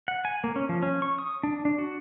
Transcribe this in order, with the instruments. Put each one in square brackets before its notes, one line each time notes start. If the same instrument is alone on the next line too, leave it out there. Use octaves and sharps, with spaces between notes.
[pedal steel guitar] F#5
G#5
A#3
C#4
F3
C#4
C#6
D#6
D4
D4
F#4